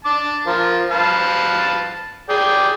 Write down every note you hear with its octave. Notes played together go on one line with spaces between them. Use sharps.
A5 D6
F3 F4 A#4
B4 F5 A5
G#4 D5 G5